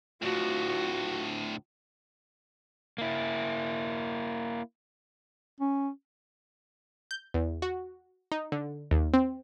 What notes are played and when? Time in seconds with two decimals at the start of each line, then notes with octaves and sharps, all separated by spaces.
0.22 D2 A2 F4 F#4
2.98 A#3 E4
5.60 C#4
7.11 G6
7.34 E2
7.62 F#4
8.32 D#4
8.52 D3
8.91 D#2
9.14 C4